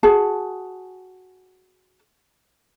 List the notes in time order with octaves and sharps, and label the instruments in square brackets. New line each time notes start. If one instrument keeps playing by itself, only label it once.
[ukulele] F#4 G#4 A5